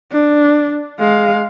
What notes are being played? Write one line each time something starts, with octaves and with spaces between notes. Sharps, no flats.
D4
G#3 F5